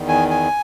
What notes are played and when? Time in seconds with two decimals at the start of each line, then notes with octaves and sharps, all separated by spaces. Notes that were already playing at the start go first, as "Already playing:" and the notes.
Already playing: E2 D#3
0.09 G#5
0.30 G#5